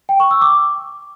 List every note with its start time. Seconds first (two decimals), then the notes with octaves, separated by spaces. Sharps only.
0.09 G5
0.20 C#6
0.31 E6
0.42 D6